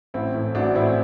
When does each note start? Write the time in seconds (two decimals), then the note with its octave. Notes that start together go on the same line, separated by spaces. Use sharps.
0.14 A1 C4 E4
0.35 A2 E3
0.55 A1 D4 F#4
0.75 A2 E3 C4 E4